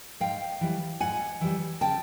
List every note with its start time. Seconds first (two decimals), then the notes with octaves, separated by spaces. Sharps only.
0.20 G#2 F5 G5
0.61 E3 G3
1.00 G#2 F#5 G#5
1.41 E3 G3
1.81 C#3 G5 A5